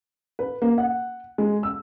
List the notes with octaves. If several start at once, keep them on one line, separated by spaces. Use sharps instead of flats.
B4
A#3
F#5
G#3
E6